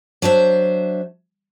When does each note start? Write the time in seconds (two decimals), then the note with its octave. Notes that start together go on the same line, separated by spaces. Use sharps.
0.22 F#3 D4 C5 E5